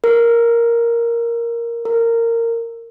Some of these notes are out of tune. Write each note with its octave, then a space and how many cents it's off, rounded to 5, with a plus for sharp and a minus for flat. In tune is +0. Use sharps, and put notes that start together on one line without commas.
A#4 +0
A#4 -15